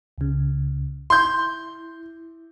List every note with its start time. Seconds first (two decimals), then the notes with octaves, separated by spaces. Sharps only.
0.18 C#2 C#3
1.10 E4 C6 G6